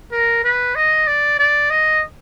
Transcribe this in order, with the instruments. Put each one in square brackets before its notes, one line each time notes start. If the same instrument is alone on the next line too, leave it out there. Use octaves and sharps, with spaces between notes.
[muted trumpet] A#4
B4
D#5
D5
D5
D#5